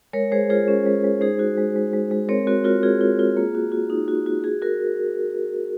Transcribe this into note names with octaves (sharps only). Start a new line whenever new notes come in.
G#3 A#4 C#5
G#3 G#4 C5
F4 G#4 C5
C#4
G#3
G#3
D#4 G#4 C5
F#4
G#3
G#3
G#3
G#3
C4 A#4 C#5
C4 F#4 A#4
F4 F#4 A#4
F4 G#4
F4
F4
A#3
F#4
F#4
D#4
F#4
F#4
F#4 G#4
F#4 A#4